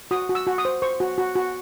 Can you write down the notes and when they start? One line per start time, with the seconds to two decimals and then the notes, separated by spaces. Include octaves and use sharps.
0.11 F#4 D#6
0.29 F#4
0.35 E6
0.47 F#4
0.58 D#6
0.65 C5
0.82 C5 C#6
1.00 F#4
1.18 F#4
1.36 F#4